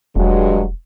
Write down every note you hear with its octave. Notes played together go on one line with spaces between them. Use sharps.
E1 G2 F#3 G#3